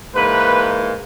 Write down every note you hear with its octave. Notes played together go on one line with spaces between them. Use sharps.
G#2 E3 A#3 B4